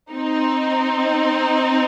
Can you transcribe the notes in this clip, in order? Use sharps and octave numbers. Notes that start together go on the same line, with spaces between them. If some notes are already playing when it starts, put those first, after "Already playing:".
C4 D#4